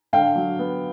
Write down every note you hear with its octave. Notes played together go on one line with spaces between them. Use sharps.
D3 F5 G5
F#3
B3